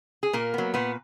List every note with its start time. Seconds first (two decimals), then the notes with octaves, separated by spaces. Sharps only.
0.23 G#4
0.33 A#2 A#3 A#4
0.54 F#3 B3
0.74 A#2 B3 B4